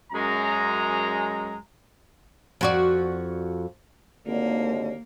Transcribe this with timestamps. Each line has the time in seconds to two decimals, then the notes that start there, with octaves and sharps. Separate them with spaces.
0.13 F#2 G#3 A#5
2.61 F2 F#4 D5
4.26 G#1 D#2 D3 A#3